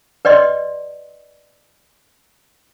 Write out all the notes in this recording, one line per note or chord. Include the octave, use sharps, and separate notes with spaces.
B4 D5 D#5 C6